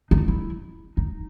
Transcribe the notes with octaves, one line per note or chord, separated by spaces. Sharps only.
D#4
E4
D#4